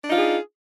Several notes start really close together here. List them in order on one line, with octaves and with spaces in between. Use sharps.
D4 D#4 F4 G#4